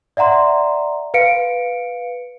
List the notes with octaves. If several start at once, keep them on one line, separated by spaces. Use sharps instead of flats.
D5 E5 F#5 A#5 C6
B4 F5 C#7 D7